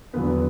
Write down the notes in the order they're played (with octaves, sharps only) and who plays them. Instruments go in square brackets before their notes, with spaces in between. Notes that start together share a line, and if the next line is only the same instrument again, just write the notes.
[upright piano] E1 E2 D3 F#3 B3 B4